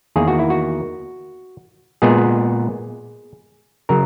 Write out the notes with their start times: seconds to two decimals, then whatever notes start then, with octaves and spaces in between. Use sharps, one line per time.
0.16 E2 D#3 A#3 G#4
0.28 F#4
0.39 E4
0.50 F#4
2.02 A#2 G#3 B3 G#4
3.89 C#3 F#3 A#4